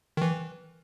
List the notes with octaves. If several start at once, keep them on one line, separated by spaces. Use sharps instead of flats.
D#3 E3